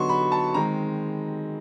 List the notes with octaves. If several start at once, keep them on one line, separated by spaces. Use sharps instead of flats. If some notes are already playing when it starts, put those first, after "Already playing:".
Already playing: D3 F#3 B3 D#4 C6 C#6
B5
A5
D#3 G#3 C4 A#5